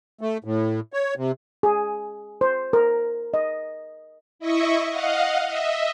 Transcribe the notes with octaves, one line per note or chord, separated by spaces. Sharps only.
A3
A2
C#5
C3
G#4
C5
A#4
D#5
E4 D#5 E5 C#6
D#5 F5 F#5
D#5 E5